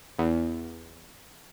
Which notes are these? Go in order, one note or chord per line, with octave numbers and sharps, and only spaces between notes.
E2